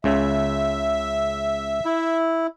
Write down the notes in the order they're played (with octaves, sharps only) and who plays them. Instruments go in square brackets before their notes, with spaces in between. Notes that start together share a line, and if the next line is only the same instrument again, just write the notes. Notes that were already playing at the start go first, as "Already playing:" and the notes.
[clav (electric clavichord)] C#2 C#3 [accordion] E5
[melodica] E4